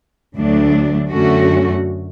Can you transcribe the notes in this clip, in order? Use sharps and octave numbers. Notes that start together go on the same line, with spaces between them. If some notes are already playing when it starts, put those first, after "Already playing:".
D2 D3 F#3 A3 D4
F#2 D3 A3 C#4 F#4